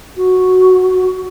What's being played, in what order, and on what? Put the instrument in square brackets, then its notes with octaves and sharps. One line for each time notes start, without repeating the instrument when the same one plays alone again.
[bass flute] F#4